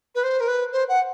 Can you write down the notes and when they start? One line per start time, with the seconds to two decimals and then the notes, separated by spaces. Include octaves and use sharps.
0.15 B4
0.23 C5
0.40 A#4
0.47 B4
0.72 C5
0.88 F#5